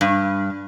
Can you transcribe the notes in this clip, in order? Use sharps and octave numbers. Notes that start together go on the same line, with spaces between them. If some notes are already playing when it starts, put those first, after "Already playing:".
G2